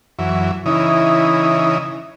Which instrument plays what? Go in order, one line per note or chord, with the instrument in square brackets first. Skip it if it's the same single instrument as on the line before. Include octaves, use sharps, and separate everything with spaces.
[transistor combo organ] F#2 E3
[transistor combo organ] C#3 E3 D#4 [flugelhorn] E4